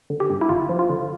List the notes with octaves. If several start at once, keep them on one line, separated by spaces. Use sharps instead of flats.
D3
G4
G2
E4
G1 F4
F3
F4
D3